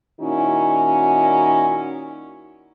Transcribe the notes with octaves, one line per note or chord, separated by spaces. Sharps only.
A#2 D#3 C#4 D#4 E4 F#4